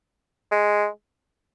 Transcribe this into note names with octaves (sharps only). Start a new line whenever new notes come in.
G#3